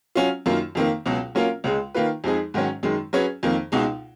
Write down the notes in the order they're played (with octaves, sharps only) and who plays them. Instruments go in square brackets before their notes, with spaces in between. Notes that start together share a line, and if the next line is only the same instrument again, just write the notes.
[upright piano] F#3 C#4 F4
F#2 D#3 A#3 F4
F2 D#3 A#3
C#2 B2 F#3
F#3 A#3 C#4 F4 A#4
C#2 C#3 G#3
D#3 A#3 F4 B4
F2 F3 G#3 D#4 G#4
G#2 D#3 F#3 C#4
F#2 D#3 G#3
F#3 C#4 G#4 B4
F2 D#3 A#3
C#2 B2 G#3 D#4